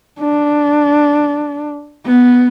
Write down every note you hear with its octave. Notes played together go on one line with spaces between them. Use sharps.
D4
B3